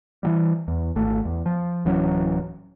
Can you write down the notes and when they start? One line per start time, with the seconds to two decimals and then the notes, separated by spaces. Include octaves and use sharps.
0.23 E3 F#3 G3
0.68 E2
0.96 G#1 A3
1.25 E2
1.46 F3
1.85 D1 E3 F#3 C#4